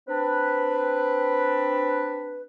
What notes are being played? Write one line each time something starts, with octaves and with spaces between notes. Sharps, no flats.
C4 D4 B4